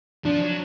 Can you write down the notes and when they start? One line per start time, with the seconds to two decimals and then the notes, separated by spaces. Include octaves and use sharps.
0.25 F3 D4
0.42 F#3